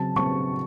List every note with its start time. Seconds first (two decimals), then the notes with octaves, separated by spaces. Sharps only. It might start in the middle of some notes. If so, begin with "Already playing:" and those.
Already playing: C#3 F#3 C4 A5
0.16 C#3 F#3 C4 C#6